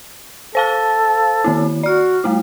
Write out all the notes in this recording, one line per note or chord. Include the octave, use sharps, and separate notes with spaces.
A4 C5 F5 A5
D#3 A#3 E4
F#4 D5 F6
G3 A3 E4